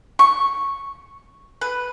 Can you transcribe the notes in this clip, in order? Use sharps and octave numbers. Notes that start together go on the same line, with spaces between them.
C#6
B4